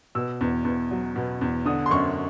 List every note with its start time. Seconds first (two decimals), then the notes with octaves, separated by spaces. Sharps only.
0.15 B2 E6
0.41 E2
0.65 E2
0.91 F#3
1.16 B2
1.41 E2
1.66 D3 D#6
1.86 C6
1.91 F#2 C#6